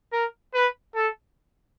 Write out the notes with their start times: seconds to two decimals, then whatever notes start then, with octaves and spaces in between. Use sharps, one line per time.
0.13 A#4
0.54 B4
0.95 A4